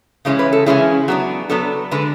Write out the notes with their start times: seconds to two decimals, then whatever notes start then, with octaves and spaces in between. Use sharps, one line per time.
0.25 C#3 E3 G#3 C#4 E4
0.39 B4
0.52 A4
0.66 C#3 E3 G#3 C#4 E4 G#4
1.08 F#3 B3 D4 F#4
1.50 F#3 B3 D4 A4
1.91 D3 G#3 D4 B4